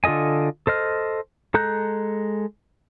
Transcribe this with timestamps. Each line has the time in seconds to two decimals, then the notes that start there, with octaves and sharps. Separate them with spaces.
0.04 D3 F4 A4 D#5 G#5
0.67 A4 C5 D#5 F6
1.54 G#3 A4 A#5 F#6 G6